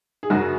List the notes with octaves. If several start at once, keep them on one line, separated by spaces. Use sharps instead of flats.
G#4
F#2 C#3 F#3 F#4